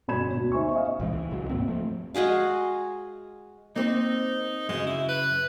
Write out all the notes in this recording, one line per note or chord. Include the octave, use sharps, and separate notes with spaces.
G1 B2 C#5 B5 G#6 E7
D2 B2
D#4 C5 E5 G#5 C#6
D#5 F5
C#2 A#2 E3 G#3
E3
C#2 C#3 F#3
G#2 B2 A#3 C4
F3 A3
G#3 F#4 G#4 F5
A#3 C4 D#4 C5
F#2 C#3 G#3
E4
B4